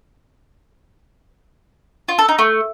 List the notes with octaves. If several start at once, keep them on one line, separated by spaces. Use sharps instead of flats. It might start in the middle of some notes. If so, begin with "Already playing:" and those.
F4
A4
D#4
A3